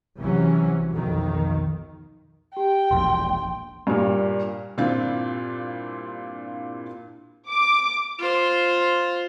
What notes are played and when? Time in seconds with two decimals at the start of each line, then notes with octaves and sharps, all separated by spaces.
0.18 C2 C3 E3 F#3 C#4
0.92 B1 F2 D#3
2.57 G4 G5
2.91 E1 A#1 C6
3.87 G2 A#2
4.78 G2 A#2 C4 D4 E4 F4
7.51 D6
8.19 F4 C5